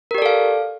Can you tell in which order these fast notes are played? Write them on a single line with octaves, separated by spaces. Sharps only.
A#4 G4 D5 A4 F5